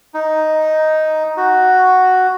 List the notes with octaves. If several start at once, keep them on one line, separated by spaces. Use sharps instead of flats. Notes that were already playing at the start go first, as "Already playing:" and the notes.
D#4
F#4